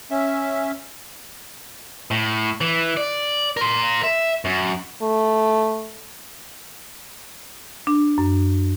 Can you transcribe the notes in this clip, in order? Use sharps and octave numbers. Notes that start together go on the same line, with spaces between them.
C#4 E5
A2
E3
D5
A#4 C6
E5
F#2
A3
D4
F#2